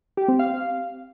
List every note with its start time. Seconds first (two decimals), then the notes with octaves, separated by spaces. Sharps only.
0.17 G4
0.28 C4
0.39 F5